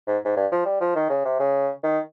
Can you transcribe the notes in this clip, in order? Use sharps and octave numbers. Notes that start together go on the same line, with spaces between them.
G#2
G#2
G2
F3
G3
F3
D#3
C#3
C3
C#3
D#3